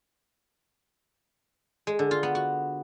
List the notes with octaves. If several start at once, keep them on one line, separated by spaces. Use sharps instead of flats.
G#3
D3
F4
B3
F#4